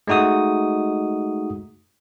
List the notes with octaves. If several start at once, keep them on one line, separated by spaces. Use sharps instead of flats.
G#3 A3 D#4 F#4 D#6